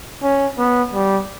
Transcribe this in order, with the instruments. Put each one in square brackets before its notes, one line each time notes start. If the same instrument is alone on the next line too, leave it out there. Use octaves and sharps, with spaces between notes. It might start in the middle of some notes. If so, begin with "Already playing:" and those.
[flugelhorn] C#4
B3
G3